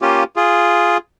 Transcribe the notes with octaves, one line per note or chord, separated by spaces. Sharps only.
A#3 C#4 F4 G4
F4 G#4